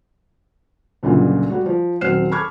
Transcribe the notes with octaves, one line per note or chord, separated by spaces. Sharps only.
C#2 F#2 A#2 D3 G3
G3 F#4
F3
D#1 F#3 C4 F6 C7 E7
A5 B5 C#6 D6 F6 G#6